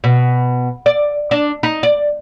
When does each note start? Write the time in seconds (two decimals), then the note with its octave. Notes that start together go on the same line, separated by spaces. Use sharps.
0.04 B2
0.86 D5
1.31 D4
1.63 D#4
1.83 D5